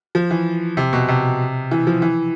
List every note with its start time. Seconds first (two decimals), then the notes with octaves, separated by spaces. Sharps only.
0.15 F3
0.31 E3
0.77 C3
0.93 B2
1.08 C3
1.71 E3
1.87 F3
2.02 E3